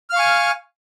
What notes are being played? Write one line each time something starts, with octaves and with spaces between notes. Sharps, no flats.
F5 G#5 C#6 F6